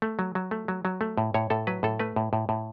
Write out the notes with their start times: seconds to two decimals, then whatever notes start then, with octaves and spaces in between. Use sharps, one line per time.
0.02 A3
0.19 F#3
0.35 F#3
0.51 A3
0.68 F#3
0.85 F#3
1.01 A3
1.18 A2
1.34 A2 C#5
1.50 A2 A4
1.67 F#3 B4
1.83 A2 A4
1.99 A3 B4
2.16 A2
2.33 A2
2.49 A2